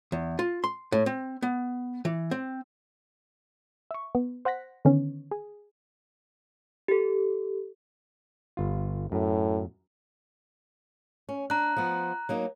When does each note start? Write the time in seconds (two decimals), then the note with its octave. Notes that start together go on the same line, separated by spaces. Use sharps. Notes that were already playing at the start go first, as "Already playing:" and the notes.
0.12 E2
0.39 F4
0.64 C6
0.92 A2
1.06 C4
1.42 B3
2.05 E3
2.31 C4
3.91 E5 C#6
4.15 B3
4.45 C5 F#5 F#6 A#6 B6
4.85 D3 D#3 B3 C#4
5.31 G#4
6.88 G4 A4
8.57 G1 F4
9.12 F#2 A2
11.29 C#4
11.50 D4 A#5 F#6
11.76 F3 B3
12.29 F#3 A#3 D#4